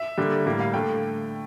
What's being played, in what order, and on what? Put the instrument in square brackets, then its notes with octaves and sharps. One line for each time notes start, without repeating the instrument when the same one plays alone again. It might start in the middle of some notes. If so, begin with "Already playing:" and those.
Already playing: [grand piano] E5
D3 G3 A#3 D4
A2 G3 A#3
F5
D3 A3 G5